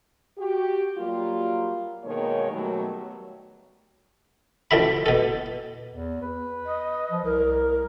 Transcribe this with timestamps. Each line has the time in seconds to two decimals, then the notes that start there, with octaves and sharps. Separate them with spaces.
0.38 F#4 G4
0.97 F#3 G3 A#3 F4
2.04 B2 D#3 G#3 A#3 C#5
2.51 B2 D#3 F#3 G3 A3
4.71 A1 D2 F3 E5 B5
5.06 B2 A4
5.94 E2
6.22 B4
6.65 D#5
7.11 F3
7.24 C2 A#4